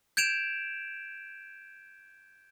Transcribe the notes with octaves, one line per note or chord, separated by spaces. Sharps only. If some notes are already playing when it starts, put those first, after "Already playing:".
G6 G#6 D7 E7 F7